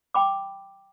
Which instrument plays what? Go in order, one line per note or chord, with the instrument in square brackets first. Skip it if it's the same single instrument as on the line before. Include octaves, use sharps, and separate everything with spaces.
[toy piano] G5 B5 D6